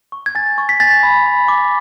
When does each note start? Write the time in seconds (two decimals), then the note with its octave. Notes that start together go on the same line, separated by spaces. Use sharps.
0.12 C#6
0.26 G#6
0.35 G#5 A6
0.58 C#6
0.69 B6
0.80 G#5 A6
1.03 B5
1.26 B5
1.48 D6